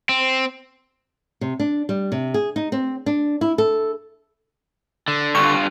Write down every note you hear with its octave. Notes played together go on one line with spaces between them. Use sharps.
C4
C3
D4
G3
C3
G#4
D#4
C4
D4
E4
A4
D3
G2 F4 C#6